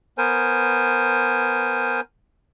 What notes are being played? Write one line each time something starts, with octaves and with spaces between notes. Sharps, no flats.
B3 A#4 C5 G#5